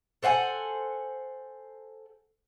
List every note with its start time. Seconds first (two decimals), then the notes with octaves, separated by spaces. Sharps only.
0.23 A4 C5 F#5 G#5